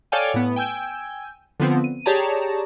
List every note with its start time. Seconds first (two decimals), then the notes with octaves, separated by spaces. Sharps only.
0.12 A4 C#5 D5 F5 G5 G#5
0.34 A2 B3
0.56 G5 G#5 E6 G6
1.60 D3 F3 B3 C4
1.84 D#7
2.06 G4 G#4 C#5 D5 A5 A#5